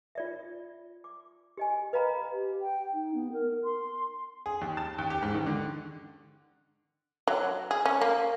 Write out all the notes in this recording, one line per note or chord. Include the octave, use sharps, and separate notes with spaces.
F4 D5 E5
D6
G4 D#5 G#5
B4 D#5 F5 A#5 B5
G4
G5
D#4
B3
A#4
C6
G#4
D#2
A5
D#2
G4
G#2
D#3
D3
F#3
G#4
C#4
A#3